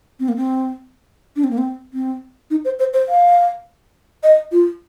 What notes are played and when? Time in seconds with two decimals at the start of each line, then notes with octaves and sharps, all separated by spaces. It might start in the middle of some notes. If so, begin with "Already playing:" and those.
0.20 C4
0.29 A#3
0.36 C4
1.36 D4
1.44 C4
1.51 A#3
1.58 C4
1.94 C4
2.51 D#4
2.65 C5
2.79 C5
2.93 C5
3.09 F5
4.23 D#5
4.52 F4